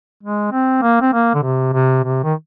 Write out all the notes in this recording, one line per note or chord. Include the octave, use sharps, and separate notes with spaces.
G#3
C4
A#3
C4
A#3
D3
C3
C3
C3
D#3